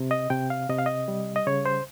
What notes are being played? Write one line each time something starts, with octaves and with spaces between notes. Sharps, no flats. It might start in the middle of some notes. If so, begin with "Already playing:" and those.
Already playing: C3
D#5
C3 G5
F5
C3 D#5
F5
D#5
G3
D#5
C#3 C#5
C5